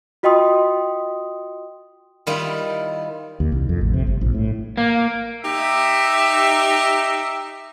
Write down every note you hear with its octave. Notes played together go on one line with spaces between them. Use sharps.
F4 F#4 D#5 G5 C6 D#6
D#3 G3 E4 F4
D#2
C2
F2
A1
C3
G1
A#1
A2
A#3
D#4 G4 E5